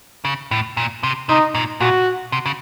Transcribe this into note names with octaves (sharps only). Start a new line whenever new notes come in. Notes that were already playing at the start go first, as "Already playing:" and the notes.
C#3
A2
A#2
C3
C3 D#4
A#2
A#2 F#4
C3
C#3